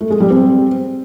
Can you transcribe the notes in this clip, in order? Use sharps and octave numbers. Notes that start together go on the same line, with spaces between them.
A3
G#3
G3
C4